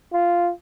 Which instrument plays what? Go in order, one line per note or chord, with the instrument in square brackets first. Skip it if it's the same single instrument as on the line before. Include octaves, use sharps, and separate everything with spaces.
[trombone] F4